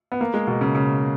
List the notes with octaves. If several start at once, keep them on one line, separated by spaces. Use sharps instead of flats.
B3
A#3
G#3
B2
C#3
C#3